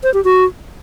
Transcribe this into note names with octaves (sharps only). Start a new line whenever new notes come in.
C5
G4
F#4